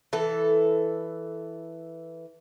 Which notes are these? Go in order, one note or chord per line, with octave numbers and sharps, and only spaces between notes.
E3 A4